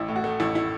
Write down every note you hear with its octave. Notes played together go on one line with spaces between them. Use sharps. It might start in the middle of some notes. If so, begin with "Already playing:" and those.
Already playing: A1 E4
A2
F#4
A3
A1 E4
E4